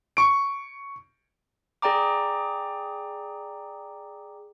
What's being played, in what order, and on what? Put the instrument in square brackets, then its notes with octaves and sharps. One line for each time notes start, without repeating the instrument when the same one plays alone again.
[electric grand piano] C#6 D7
[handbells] G#4 D5 G5 A#5 D6